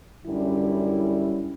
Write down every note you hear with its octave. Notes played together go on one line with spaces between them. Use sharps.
F#2 D3 G3 C#4 E4